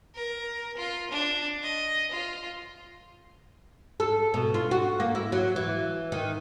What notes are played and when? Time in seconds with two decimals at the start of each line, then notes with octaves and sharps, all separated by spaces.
0.15 A#4
0.77 F4
1.11 D4
1.62 D#5
2.12 F4
4.00 A4
4.34 B2
4.54 F4
4.71 F#4
5.00 A#3
5.15 E4
5.32 F#3
5.56 E3
6.12 D#3